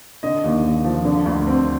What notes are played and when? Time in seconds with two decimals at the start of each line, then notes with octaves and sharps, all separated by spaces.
0.23 D3 D#5
0.44 D#2
0.65 D#2
0.85 F3
1.05 D3
1.26 D2
1.47 C4